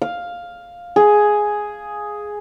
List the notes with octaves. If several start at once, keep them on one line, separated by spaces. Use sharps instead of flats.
F5
G#4